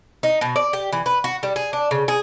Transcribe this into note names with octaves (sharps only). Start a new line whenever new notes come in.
D#4
B2
D5
G4
E3
B4
F#4
G3
G#4
D4
C#3
G#4